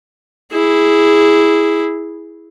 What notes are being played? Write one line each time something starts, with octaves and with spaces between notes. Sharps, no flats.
E4 G#4